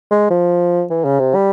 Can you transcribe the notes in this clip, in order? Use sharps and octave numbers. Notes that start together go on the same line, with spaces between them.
G#3
F3
E3
C#3
C3
G3